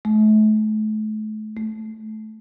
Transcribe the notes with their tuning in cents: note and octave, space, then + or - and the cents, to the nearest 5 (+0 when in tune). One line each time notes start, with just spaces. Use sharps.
A3 -35
A3 -10